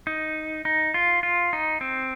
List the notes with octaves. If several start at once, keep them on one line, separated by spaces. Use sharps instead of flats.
D#4
D#4
F4
F4
D#4
C4